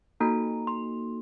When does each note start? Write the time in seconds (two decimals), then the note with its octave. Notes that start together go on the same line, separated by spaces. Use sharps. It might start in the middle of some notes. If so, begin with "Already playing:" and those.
0.20 A#3 D#4 F#4 A4 A#5
0.67 C6